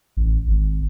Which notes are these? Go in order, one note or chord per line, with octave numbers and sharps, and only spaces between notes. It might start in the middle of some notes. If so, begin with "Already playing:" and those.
A1
G#1